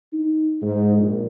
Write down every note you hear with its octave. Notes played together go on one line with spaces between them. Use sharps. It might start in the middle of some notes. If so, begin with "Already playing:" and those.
D#4
G#2
A#1